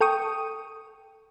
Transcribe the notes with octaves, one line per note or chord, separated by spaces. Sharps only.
A4 G5 C#6 D#6